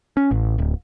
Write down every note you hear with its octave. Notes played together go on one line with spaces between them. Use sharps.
C#4
A1
D1